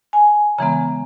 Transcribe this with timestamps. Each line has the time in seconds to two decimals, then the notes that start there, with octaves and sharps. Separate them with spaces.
0.13 G#5
0.58 C#3 E3 G#3 B3 A#5